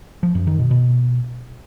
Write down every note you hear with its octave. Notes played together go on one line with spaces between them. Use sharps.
F3
F#2
D#3
B2
B2